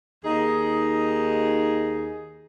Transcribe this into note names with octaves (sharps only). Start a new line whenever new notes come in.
D#2 D#4 G#4